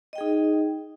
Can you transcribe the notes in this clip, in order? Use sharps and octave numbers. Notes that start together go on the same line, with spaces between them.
D#4 G#4 D#5 G5